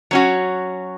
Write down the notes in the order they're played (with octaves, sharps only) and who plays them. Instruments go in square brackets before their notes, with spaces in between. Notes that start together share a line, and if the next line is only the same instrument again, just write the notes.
[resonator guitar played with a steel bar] F#3 C#4 F#4